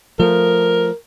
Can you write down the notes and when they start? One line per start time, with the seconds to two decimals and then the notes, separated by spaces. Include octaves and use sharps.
0.19 F3 A3 A#4